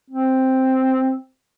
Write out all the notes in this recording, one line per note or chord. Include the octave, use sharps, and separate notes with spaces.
C4